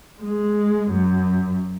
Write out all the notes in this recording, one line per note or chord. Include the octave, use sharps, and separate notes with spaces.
G#3
F#2